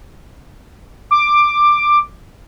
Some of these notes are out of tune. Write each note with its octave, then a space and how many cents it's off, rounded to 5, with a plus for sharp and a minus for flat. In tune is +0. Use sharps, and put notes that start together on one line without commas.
D6 +10